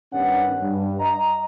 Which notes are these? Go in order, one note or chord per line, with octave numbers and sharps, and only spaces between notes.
G2 D#3 G3 B3 C#4 F#5
G2
D#5 A#5